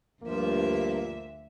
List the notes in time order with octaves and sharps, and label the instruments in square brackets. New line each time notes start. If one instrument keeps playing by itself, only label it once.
[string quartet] D2 E5 [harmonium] G2 F3 [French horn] A#3